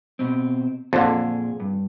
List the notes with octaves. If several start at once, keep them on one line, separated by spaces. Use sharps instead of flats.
B2 C4
F2 A#2 D3 G#4
G2